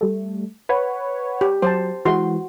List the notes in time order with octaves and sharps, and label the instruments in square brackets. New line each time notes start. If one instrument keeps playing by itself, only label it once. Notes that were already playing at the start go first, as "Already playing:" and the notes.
[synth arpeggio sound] G3 A3
B4 C#5 F#5
[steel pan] G4
[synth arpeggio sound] F#3 [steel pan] C5 A5
[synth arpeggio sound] E3 G#3 E4 [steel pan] F#4 C6